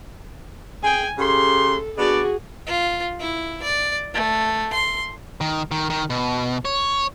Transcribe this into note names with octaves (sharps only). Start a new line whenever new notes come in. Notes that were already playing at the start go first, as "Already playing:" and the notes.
G#4 G5 G#5
C#3 G4 A4 C6
B3 D4 F#4 G#4 D5
F4
E4
D5
A3
C6
D#3
D#3
D#3
B2
C#5